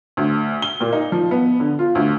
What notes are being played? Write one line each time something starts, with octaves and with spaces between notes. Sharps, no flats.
D2
G7
A#2
D#4
F3
B3
D3
F4
D2